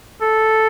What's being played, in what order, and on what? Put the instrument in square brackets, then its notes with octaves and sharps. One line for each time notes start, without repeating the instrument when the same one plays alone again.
[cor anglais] A4